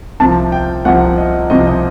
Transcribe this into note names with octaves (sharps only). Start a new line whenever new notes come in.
C2 C3 F3 A5
G5
C2 C3 F3 F#5
D#5
C2 C3 F3 D#5
D#5